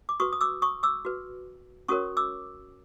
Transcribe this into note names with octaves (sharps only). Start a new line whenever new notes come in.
D6
F#4 B4 C#6 D#6
D#6
D6 E6
C#6 D#6
D6 E6
F#4 B4
C#4 F#4 A#4 C#5 C#6 D#6
D6 E6